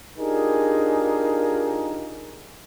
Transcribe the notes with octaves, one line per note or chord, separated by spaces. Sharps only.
D4 D#4 F4 G4 G#4 A#4